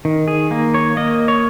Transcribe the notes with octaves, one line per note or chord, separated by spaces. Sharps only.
D#3
G#4
A#3
C#5
A#3 D#5
C#5